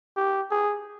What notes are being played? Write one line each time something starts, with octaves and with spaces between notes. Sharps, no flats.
G4
G#4